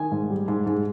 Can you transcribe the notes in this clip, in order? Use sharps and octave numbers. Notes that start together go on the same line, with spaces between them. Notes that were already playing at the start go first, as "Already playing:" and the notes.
Already playing: D#3 G#5
G#2
G3
G#2
G#2